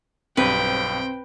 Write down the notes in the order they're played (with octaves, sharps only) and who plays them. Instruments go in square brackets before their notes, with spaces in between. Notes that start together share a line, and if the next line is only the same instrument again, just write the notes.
[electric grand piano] B1 G2 [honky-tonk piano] C4 [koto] B4 [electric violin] G5